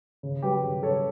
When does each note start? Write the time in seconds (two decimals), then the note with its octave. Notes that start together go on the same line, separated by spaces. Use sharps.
0.23 C#3
0.43 F#3 G4 B4
0.63 C#3
0.83 C#3 A4 C#5